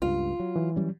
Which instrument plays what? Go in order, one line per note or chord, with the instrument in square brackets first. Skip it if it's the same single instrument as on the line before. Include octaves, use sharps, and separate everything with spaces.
[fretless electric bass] C#2 G2 [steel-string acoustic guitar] F4
[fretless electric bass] F#3
[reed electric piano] E3
[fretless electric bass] F#3 G3 C#4